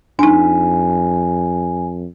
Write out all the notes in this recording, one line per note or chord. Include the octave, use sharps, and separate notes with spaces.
F2 D4 D#4 G#5